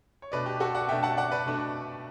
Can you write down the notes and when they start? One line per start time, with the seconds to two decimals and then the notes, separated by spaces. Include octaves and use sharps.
0.22 C#5
0.32 B2 A3 D4 B4 D5
0.46 G4
0.60 F#4 A4
0.75 D5 F#5
0.89 B2 A3 D4 E5 G5
1.03 F#5 A5
1.17 D5 F#5
1.32 B4 D5
1.46 B2 A3 D4